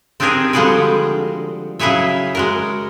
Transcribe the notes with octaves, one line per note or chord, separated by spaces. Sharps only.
C4 D4 D#4 G4 G#4 A#4
D3 F3 G3 G#3 F#4 G#4
C#3 F#3 E4 G#4 C#5 E5
G#3 F#4 A#4